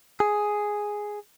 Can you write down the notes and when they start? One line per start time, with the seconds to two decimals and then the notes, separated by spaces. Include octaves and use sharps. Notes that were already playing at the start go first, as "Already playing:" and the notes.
0.20 G#4